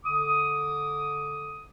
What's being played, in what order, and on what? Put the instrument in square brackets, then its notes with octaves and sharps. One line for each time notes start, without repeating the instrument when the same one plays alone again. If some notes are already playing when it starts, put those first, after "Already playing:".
[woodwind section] D3 D6 D#6